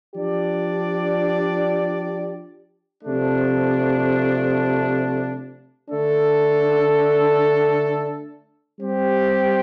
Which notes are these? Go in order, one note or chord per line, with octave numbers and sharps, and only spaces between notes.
F3 D4 G4 D5
C3 F3 A3 D4
D3 A3 D4 A4
G3 C4 G4